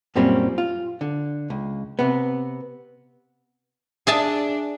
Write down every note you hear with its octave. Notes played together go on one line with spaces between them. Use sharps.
F#2 A#2 G3 A#3 C4 C#4
F4
D3
C#2
C3 B3
D4 G#4 E5 A5